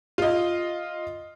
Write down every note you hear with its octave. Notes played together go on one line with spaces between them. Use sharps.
F4 D#5